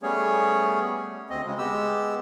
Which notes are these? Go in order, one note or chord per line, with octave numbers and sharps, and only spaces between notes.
G3 A3 B3 C#4 G#4 C#5
D2 C4 D#5
C#3 G#3
G#3 B3 G4 E6